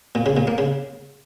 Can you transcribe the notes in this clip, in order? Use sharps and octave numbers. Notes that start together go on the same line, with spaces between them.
A#2
C#3
A#2
A#3
C#3